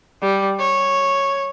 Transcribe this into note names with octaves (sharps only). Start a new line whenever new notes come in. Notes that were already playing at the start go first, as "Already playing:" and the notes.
G3
C#5